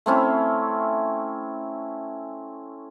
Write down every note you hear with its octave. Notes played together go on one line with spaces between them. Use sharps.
A3 C4 C#4 E4